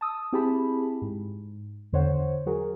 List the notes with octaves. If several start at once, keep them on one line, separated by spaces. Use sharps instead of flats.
A5 D#6 E6
C4 E4 G4 G#4 A5 B5
G#2
E2 D3 C5 C#5 F#5
F#3 F#4 G#4 A#4